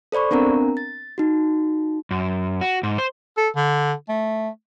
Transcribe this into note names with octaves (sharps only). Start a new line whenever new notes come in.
A4 C5 D5 B5 C#6
B3 C4 D4 A#4 A#5
A6
D#4 F#4
F#2
F#4
G#2
C5
A4
D3
A3